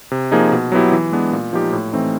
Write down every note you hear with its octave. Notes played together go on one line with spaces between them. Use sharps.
C3
F3 A#3 D#4 G#4
B2
F#3 B3 E4 G4
E3
G#3 B3 D4
A#2
F3 A#3 D#4 G4
A2
E3 A3 C4 D#4